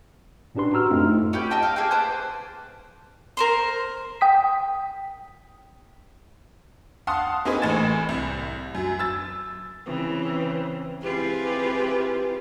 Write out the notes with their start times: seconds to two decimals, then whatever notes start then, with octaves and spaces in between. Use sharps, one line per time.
0.55 A2 C#4 D4 G4 B4 C6
0.73 F#4 A#5 E6 F6
0.90 F#2 A3 C4 D4 D#4 F4
1.10 A3 F4
1.33 C#4 G4 B4 G5
1.51 D#5 E5 G5 A5
1.63 F5 G5
1.76 A#3 G#4 A4 G5
1.91 B4 C5 A5 D6
3.37 A#4 C5 C6
4.21 G5 D#6 B6
7.07 F5 F#5 A5 C6 D#6
7.45 A#3 C4 D#4 G#4 B4 C5
7.62 A1 A2 G#5 A6 E7
8.09 C2
8.75 F#2
8.99 E6 A6
9.85 C#3 E3 C4
11.01 C4 E4 F4 G4 G#4 B4